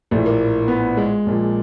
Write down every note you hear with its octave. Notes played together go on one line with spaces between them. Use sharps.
A#1 A2 E3 A3
A#3
B3
G#3
A#1 A#2 F3